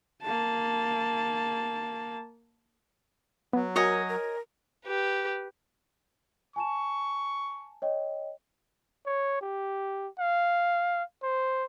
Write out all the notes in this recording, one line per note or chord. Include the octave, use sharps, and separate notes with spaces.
A#3 A5
F#3 B3
F#4 A#4 C#5 D#5 G#5
A#4
G4 B4
G#5 A5 C#6 E7
C#5 D#5 G5
C#5
G4
F5
C5